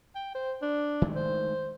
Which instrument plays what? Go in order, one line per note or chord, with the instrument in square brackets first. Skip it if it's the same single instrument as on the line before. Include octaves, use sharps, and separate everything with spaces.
[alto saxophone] G5
C5
D4
[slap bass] D#3 G#3 A3
[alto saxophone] C5